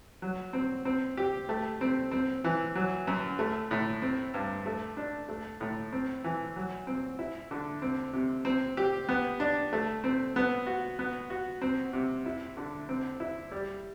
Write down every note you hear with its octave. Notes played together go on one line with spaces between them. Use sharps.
F#3
C4
C4
G4
A3
C4
C4
E3
F#3
F#2
A3
A2
C4
G2
A3
D4
A3
A2
C4
E3
F#3
C4
E4
D3
C4
C3
C4
G4
B3
D4
A3
C4
B3
F#4
B3
F#4
C4
C3
E4
D3
C4
E4
G3